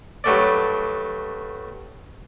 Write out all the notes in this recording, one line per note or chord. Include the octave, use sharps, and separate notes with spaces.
G2 F#3 A3 D5